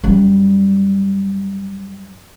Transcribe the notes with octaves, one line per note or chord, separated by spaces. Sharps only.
F#2 G3